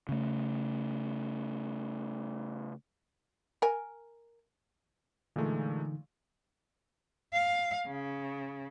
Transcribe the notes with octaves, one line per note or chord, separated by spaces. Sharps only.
C#3 A3
A#4 G#5
A#2 D3 E3 G#3 A3 D#4
F5
C#3